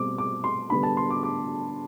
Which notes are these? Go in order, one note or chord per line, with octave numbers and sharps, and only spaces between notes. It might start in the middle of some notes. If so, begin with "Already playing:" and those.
Already playing: B2 G3 C4 D6
D6
C6
D3 G3 B3 D4 B5
A5
C6
D6
D6